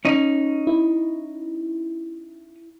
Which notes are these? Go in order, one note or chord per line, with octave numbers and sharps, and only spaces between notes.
C#4 D#4
E4